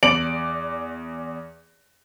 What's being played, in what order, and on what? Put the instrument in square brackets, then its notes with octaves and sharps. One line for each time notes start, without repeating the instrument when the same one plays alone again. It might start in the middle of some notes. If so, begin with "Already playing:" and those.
[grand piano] E2 D5 D7 F#7